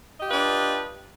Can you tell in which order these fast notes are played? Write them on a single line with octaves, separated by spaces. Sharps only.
D#5 G4 F4 B4 D4